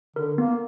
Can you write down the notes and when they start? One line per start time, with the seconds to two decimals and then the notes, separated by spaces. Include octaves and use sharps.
0.16 D3 A#4
0.38 A#3 B3